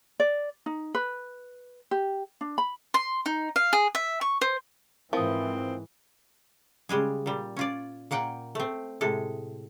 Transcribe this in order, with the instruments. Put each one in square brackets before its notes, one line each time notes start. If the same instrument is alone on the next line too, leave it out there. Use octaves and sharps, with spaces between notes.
[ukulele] D5
D#4
B4
G4
D4
B5
[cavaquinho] C6
D#4
F5
G#4
E5
C#6
C5
[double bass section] G#2 E3 [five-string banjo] F3 [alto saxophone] C4 [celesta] A#4 D#6
[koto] C#3 G3 G#3 G#4
A#2 G3
C#4 F4 D5
A#2 A#3 F#5 G5
A3 C4
A2 C3 G#3 A4